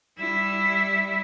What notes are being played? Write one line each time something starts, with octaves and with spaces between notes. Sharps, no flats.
G3 E4